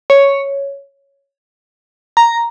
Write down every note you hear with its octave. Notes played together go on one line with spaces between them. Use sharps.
C#5
A#5